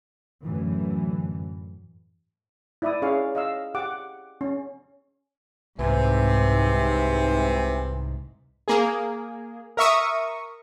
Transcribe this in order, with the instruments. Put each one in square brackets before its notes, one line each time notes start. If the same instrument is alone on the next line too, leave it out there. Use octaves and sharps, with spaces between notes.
[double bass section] F#2 A2 D3 E3
[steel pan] E4 D5 E5 B5 D#6
C#4 G#4 C#5 E5 F5
D#5 F5 E6
G4 F#5 D6
C#4
[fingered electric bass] C2 [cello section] G#2 [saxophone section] C3 [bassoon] E3
[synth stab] A#3 G#4
A#4 E5 C#6 D#6